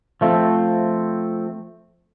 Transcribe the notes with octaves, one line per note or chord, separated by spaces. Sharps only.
F3 A3 C4